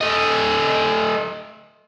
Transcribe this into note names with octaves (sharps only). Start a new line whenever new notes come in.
A3 D#5